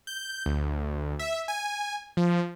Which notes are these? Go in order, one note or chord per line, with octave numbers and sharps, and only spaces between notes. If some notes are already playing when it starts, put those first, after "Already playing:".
G6
D2
E5
G#5
F3